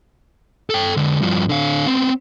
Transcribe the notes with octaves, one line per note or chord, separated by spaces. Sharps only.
A4 G5
D3 G#3
G2 F3
D3 F5
B3 C4